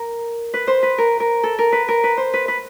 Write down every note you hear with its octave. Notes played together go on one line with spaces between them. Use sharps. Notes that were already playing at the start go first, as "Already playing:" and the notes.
Already playing: A#4
B4
C5
B4
A#4
A#4
A4
A#4
B4
A#4
B4
C5
B4
B4